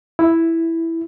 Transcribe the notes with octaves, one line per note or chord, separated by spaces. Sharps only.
E4